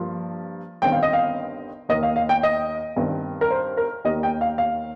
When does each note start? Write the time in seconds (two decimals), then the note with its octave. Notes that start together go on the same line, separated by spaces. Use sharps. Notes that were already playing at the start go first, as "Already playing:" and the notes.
Already playing: G2 F3 A#3 F4
0.82 G1 G2 D#3 C4 G5
0.92 F5
1.03 D#5
1.13 F5
1.89 D#2 D#3 A#3 D#5
2.03 F5
2.16 F5
2.29 G5
2.43 D#5
2.96 G2 D#3 C4
3.41 A#4
3.51 C5
3.77 A#4
4.05 D#2 D#3 G3 A#3 D#5
4.23 G5
4.41 F5
4.58 F5